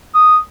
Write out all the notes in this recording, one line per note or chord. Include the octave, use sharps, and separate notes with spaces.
D#6